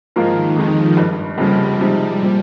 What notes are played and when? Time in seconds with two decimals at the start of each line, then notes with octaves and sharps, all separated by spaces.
0.16 G#2 D#3 F3 A#3 F4 A#4
0.56 F2 D#3 F3 G#3 D#4
0.97 G#1 G2 G3
1.38 F1 D#2 C#3 F3 G3
1.80 C3 F3 G#3 D#4
2.22 A#2 F3